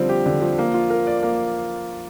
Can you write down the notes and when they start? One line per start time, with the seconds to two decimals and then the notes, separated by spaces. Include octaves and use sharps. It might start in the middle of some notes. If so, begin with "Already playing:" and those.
Already playing: D3 F3 G3 C4
0.09 G4
0.26 D3
0.42 F3
0.58 A#3
0.74 F4
0.90 A#4
1.07 D5
1.23 A#3